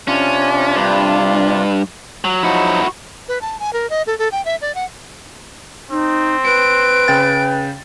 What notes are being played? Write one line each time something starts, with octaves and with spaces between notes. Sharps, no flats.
C3 C#4 D4 F4
G2
F#3
F3 F#3 D#4 E4 F#4
B4
A5
G#5
A#4
D#5
A4
A4
G5
E5
D5
F#5
C4 D#4
B4 D7
C#3 G5 A6